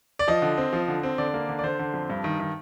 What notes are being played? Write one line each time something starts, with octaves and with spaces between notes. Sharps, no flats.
D5
F3 D#5
D3
C4
F3
D3
C4
D3 D5
A#3
D3
D5
D3 C5
D3
F2
G2
D#3
D#3